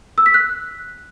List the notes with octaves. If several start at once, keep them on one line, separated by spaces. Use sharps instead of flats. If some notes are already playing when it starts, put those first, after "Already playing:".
E6
B6
F#6